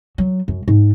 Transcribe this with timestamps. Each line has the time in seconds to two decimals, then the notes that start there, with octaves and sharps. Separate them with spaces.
0.18 F#3
0.48 F#2
0.68 G#2